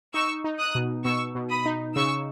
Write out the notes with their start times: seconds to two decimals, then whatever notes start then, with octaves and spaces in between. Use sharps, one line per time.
0.14 D#4 C#6 E6
0.44 D#4
0.59 D#6 F#6
0.75 B2
1.05 B2 C#6 E6
1.35 B2
1.50 B5 D#6
1.66 D#4
1.95 C#3 C#6 E6